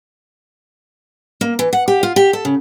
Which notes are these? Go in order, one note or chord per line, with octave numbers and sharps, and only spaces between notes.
A#3
E3
F#5
G4
F4
G4
A4
C#3